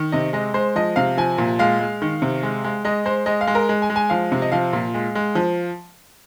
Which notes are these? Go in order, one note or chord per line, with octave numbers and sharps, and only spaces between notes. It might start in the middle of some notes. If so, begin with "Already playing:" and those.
Already playing: D#3
C3 D#5
G#3 D#5
G#3 C5
F3 D#5
C3 F5
F3 G#5
A#2
G#3 F5
G#3
D#3
C3
G#3
G#3
G#3 D#5
G#3 C5
G#3 D#5
F5
G#3
A#4
G#3
G#5
G#3
G#5
F3 F5
C3
D#5
F3 F5
A#2
G#3
G#3
F3